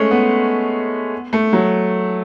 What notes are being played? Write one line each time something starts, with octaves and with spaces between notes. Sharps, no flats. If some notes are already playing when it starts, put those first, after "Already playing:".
Already playing: G#3 A3 C#4
B3
A3
F#3